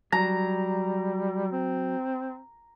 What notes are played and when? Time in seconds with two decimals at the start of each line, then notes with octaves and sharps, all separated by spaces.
0.12 F#3 G3 A#5
1.51 C4